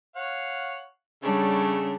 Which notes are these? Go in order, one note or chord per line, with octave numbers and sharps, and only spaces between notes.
C#5 F5 F#5
C#3 G3 A3 D4 C#5